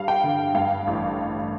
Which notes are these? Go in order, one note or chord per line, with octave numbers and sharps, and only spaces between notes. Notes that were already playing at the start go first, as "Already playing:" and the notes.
Already playing: G2 G3 F5
G5
D3
G2 F5
A1